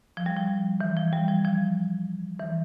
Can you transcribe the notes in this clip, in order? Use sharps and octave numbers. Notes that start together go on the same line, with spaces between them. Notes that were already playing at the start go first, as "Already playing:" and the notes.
F3
G3
F3
E3
F3
G3
F3
F3
E3